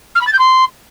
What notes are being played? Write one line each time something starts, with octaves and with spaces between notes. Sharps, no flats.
F6
B5
A6
G6
C6